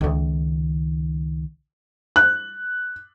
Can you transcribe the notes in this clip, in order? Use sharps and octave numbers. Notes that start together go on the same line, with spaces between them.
C#2 D#3
F#6